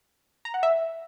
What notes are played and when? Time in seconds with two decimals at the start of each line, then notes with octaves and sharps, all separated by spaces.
0.45 A#5
0.54 F#5
0.63 E5